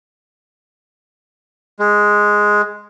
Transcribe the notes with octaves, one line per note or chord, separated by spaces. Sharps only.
G#3